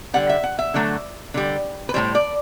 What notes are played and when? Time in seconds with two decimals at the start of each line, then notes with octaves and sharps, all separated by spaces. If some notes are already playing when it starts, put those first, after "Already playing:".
0.14 D3 G3 F#5
0.29 E5
0.44 F#5
0.59 E5
0.74 D3 F#3 A3
1.34 D3 G3
1.89 B4
1.94 A2 E3 G3 C5
2.15 D5